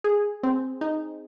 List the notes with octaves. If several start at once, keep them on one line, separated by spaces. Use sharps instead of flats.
G#4
C4
D#4